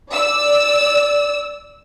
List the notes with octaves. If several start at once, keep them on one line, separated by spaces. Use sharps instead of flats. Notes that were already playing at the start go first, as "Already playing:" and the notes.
D5 E6